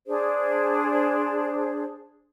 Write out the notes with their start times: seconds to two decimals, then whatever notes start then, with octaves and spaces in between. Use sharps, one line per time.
0.07 D4 G#4 C5